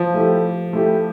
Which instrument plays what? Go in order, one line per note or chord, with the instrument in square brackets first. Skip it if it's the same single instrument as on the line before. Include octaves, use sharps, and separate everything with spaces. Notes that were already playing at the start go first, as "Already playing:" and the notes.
Already playing: [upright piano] F3
[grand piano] A3 E4 G4
A3 E4 G4